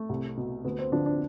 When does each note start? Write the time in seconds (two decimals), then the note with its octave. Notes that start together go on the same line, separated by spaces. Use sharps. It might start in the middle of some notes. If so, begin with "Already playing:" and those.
Already playing: A3
0.09 C2
0.37 B2
0.65 D2 B3
0.79 C4
0.92 D3 F3 D4
1.06 D4